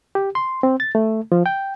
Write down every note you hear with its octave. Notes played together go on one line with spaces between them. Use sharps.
G4
C6
C4
A6
A3
F3
G5